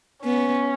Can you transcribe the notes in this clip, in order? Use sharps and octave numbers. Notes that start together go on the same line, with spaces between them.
B3 C#4